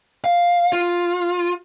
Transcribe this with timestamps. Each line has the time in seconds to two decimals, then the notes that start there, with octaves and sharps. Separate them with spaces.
0.24 F5
0.73 F4